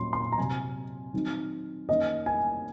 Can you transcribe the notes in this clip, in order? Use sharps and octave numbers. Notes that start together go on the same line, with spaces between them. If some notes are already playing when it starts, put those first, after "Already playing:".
Already playing: A#2 F#3 C#4 C6
C6
A#5
C3 F#3 C4 G#5
D#3 F#3 C4 D#4
D#3 A#3 C#4 D#5
G#5